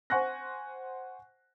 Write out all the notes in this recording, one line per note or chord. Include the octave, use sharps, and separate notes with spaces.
C5 F#5 G#5 C#6 F#6 A#6